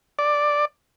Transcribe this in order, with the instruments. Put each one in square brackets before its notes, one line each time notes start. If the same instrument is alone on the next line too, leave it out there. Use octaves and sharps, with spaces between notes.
[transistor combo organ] D5